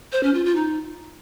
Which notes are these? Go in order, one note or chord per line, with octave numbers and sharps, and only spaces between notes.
C5
C#4
F4
F4
D#4